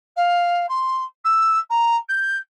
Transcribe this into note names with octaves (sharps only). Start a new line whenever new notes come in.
F5
C6
E6
A#5
G6